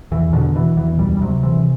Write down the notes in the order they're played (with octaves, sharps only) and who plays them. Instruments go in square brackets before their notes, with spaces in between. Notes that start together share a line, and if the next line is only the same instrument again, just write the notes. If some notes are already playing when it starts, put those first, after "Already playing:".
[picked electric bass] E2 E3
B2 D3
B2 E3
E2 E3
D2 G3
G3
C3 F#3
C3 E3